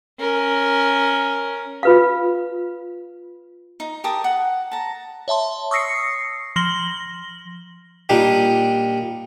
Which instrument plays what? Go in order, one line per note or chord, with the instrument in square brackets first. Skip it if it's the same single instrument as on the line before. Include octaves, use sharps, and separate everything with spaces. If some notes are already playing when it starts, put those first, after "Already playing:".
[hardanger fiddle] C#4 A#4
[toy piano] F4 B4 F5
[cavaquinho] D#4
G4 A#4 A5 D#6
F#5
A5 A#5
[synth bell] C#5 E5 A5 C6
C#6 D#6 E6 A#6 C7 C#7
F3 C6 A#6 F#7 G7
[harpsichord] A#2 G3 D4 D#4 G4